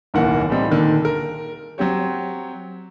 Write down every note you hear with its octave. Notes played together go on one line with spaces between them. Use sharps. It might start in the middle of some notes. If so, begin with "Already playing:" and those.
D1 B1 D#3 E3 A#3 F#5
A2 E3 G3 C4 D#4
A#2 D3 D#3
A#4
F#3 C4 G4 C#5